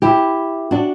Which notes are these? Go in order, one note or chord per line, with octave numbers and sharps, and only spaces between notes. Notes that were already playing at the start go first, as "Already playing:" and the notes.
E4 G4
D4 F#4